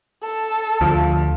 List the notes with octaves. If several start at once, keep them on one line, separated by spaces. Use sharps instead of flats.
A4 A5
D2 F3